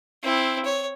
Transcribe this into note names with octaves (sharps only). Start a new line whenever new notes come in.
C4 E4
C#5